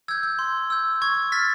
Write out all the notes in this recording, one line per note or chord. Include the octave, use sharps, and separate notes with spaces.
E6 G6 G#6
G6
C6
E6 G6
C#6 G#6
F6 A6 B6